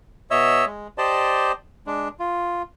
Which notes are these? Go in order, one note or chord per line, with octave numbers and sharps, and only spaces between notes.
B2 C#5 D#5 E5 E6
G#3
G4 C5 D5 D#5 A5
G#3 D4
F4